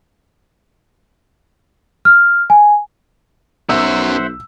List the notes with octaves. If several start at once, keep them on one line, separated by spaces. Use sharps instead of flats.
F6
G#5
B1 F#2 F#4 C5 E5 F#5 E6